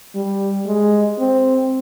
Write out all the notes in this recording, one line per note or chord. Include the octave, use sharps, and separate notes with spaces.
G3
G#3
C4